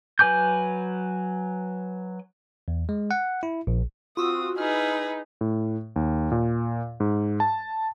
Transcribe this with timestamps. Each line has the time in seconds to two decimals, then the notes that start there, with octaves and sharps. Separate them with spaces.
0.19 F#3 B4 G#5 D6 G6
2.68 E2
2.89 G#3
3.11 F#5
3.43 E4
3.67 A#1
4.17 C4 F4 F#4 D#6 E6
4.58 D#4 E4 G#4 B4 F6
5.41 A2
5.96 D#2
6.32 A#2
7.00 G#2
7.40 A5